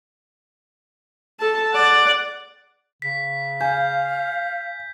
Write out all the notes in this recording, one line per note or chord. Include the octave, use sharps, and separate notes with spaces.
A4 A5
D5 F#5
C#3 B6
F5 G#5 G6